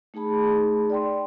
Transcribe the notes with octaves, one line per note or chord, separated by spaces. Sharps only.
A3 D#4 G#4 A5 B5
D5 G5 C6